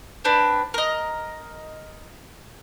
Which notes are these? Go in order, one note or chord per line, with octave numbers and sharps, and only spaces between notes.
C4 D4 B4
A#4 D#5